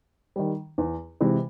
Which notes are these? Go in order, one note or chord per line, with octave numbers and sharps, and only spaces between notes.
D#3 G3
E2
C3 E3 G#3